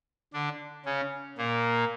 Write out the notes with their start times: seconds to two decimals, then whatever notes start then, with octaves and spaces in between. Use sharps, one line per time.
0.33 D3 D4
0.85 C#3 C#4
1.38 A#2 A#3